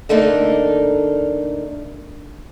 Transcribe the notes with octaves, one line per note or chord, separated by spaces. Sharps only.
D3 A3 A#3 D4 D#4